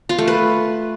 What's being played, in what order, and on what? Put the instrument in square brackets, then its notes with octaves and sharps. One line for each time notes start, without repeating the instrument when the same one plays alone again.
[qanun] F4
A3
B4